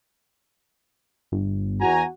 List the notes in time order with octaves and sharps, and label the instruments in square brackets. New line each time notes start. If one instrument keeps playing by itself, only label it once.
[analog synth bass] G1
[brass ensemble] E2 G#5 A#5 [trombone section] F#4